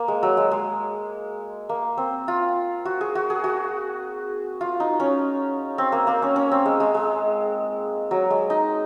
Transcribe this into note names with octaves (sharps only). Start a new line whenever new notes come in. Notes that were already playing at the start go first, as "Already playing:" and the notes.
Already playing: A#3
G#3
F#3
G#3
G#3
A#3
C4
F4
F#4
G#4
F#4
G#4
F#4
F4
D#4
C#4
C4
A#3
A#3
C#4
C#4
C4
G#3
G#3
G#3
F#3
G#3
D#4